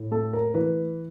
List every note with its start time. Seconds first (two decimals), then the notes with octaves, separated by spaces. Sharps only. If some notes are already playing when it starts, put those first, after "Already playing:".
Already playing: A2
0.11 A3 A4
0.33 A#4
0.54 E3 B4